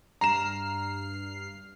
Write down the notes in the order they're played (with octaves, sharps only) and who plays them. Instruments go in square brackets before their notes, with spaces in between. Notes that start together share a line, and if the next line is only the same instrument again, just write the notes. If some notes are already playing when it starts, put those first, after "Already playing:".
[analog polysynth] G2 F6 C7 [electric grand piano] A#5 E7